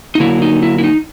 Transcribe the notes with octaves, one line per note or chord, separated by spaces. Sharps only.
D#4
D3 F#3 A#3 E4
D#4
E4
E4
D#4